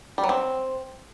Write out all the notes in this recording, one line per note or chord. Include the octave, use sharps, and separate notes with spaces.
G3
F#3
C4